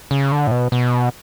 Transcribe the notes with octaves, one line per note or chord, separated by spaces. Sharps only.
C#3
D3
A2
B2
B2